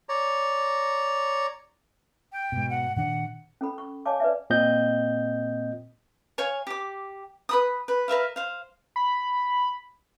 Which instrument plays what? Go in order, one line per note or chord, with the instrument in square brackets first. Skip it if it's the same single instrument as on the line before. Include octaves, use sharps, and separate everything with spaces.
[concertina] C#5 D5 A#5
[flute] G5
[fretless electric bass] G#2 B2
[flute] F#5
[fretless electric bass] A#2 D#3 D4 [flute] F#5
[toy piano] C#4 A4 B5
C#6
C#5 D#5 F5 G#5 A5 D6
B4 D5 E5
[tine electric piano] A#2 C4 D#5 G6
[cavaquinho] C#5 F5 G#5 C#6
G4 D6
B4 B5 D#6
B4
A#4 B4 E5 F5
C5 F5
[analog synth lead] B5